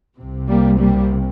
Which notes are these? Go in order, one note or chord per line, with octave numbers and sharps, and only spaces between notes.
C2 C3
G3 A#3
G3 A#3